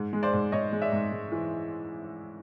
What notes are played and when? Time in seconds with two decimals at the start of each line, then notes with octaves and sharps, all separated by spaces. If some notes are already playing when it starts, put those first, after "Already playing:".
Already playing: G#2
0.13 G#3
0.23 C5 D5
0.33 G#2
0.52 G#2 C#5 D#5
0.73 G#3
0.82 D5 E5
0.92 G#2
1.12 G#2
1.32 E3